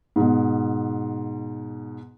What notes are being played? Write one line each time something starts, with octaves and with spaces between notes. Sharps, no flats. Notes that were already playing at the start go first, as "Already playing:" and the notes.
G#2 B2